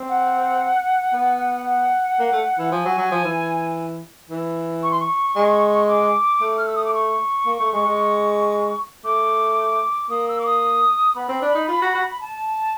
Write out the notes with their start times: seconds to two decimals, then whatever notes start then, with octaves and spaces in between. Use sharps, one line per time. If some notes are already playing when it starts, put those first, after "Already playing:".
Already playing: C4
0.09 F#5
1.13 B3
1.66 F#5
2.19 A#3
2.32 A3
2.59 E3
2.72 F3 G#5
2.85 F#3
2.98 F#3
3.11 F3
3.25 E3
4.30 E3
4.83 C#6
4.91 C6
5.00 C#6
5.36 G#3
5.88 D6
6.41 A3
6.58 F6
6.67 E6
6.76 D#6
6.85 D6
6.94 C#6
7.46 A#3
7.60 A3
7.73 G#3
7.86 G#3
9.04 A3 D6
10.10 A#3 D#6
10.28 E6
10.39 D6
10.46 D#6
11.16 B3 B5
11.29 C4
11.42 D4
11.55 D#4
11.68 F4
11.82 F#4
11.95 F#4
12.21 A5